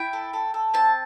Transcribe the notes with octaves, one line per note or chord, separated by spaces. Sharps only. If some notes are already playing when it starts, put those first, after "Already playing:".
Already playing: E4 G5
A4
A4
A4
C4 A5